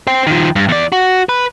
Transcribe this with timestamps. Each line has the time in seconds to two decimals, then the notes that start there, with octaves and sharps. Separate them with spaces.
0.07 C5 G5
0.27 D#3 F3
0.56 G2
0.69 E2 D5
0.92 F#4
1.29 B4